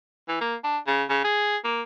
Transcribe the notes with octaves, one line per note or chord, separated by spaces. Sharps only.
E3
A#3
D4
C#3
C#3
G#4
A#3